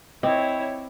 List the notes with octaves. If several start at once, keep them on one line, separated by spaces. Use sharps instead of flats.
C4 E4 C#5 D#5 D6